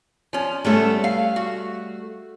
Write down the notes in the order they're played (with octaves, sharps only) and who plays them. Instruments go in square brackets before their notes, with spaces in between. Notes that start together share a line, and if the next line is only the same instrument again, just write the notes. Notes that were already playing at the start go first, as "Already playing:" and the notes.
[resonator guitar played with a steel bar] F3 C#4
[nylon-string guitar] G3 A3 [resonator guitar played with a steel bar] B3 C#4 A4
[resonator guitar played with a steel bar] F5
F#4